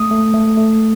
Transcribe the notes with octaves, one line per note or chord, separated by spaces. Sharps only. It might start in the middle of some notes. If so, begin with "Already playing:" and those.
Already playing: A3 D#6
A3
A3
A3